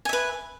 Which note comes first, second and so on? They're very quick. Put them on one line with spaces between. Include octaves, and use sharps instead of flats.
G#5 E5 B4